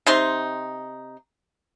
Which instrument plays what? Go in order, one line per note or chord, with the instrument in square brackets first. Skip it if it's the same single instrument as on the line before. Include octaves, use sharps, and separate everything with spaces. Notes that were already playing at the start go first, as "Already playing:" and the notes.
[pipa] C3 D#4 C6